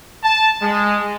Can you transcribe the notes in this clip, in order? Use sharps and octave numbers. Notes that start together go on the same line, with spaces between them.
A5
G#3